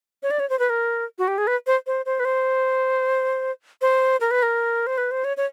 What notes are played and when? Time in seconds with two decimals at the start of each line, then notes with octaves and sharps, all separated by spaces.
0.23 C#5
0.31 D5
0.39 C#5
0.50 C5
0.59 B4
0.70 A#4
1.18 F#4
1.28 G4
1.38 G#4
1.47 B4
1.67 C5
1.87 C5
2.06 C5
2.20 B4
2.25 C5
3.81 C5
4.21 A#4
4.31 B4
4.43 A#4
4.87 C5
4.98 B4
5.11 C5
5.24 C#5
5.37 C#5